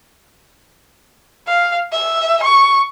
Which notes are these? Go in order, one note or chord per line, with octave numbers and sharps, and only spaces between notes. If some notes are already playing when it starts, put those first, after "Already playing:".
F5
E5
C#6